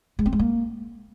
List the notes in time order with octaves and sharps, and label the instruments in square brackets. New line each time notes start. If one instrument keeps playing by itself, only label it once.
[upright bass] G#3
C4
G#3
A#3